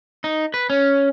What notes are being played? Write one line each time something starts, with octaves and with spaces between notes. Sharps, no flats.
D#4
B4
C#4